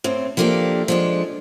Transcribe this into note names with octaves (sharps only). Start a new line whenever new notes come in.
A2 C4
F3 A3 A#3 D4 G4
F3 G#3 D4